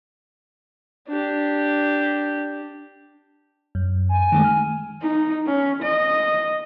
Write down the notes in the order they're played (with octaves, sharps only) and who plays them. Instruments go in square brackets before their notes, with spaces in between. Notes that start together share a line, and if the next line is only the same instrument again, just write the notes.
[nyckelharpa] D4 G4
[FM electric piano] F#2
[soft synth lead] G#5
[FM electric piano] D#3 G#3 A3
F6
[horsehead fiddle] D#4
C#4
D#5